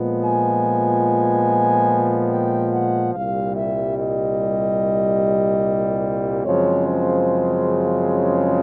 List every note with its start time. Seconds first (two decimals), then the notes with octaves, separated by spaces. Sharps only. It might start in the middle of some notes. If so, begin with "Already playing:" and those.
Already playing: A#2 F3 G#3 B3
0.23 G#5
2.30 G5
2.72 F#5
3.14 C2 A#2 G3 F5
3.55 E5
3.97 D#5
6.46 F#2 C#3 F3 G#3 C4 C#5
6.88 C5
8.13 C#5